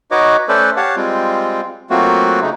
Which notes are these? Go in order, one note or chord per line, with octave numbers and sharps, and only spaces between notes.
D#4 F#4 B4 C#5 D#5 D6
A3 C#4 A4 B4 C5 D5
G4 C#5 F5 F#5 A5
G3 G#3 C4 F4
F#3 A3 A#3 C4 F4 F#4
C#3 A3 D#4